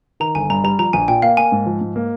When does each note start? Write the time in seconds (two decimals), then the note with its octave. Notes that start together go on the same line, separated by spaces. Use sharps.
0.20 D#3 A#5
0.35 G1 G#5
0.50 G2 A#5
0.64 G3 A#5
0.79 F3 A#5
0.93 A#1 G#5
1.08 A#2 G5
1.22 A#3 F5
1.37 A#3 G#5
1.52 G#2
1.66 F3
1.81 G#2
1.96 A#3